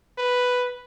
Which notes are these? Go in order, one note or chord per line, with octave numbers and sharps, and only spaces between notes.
B4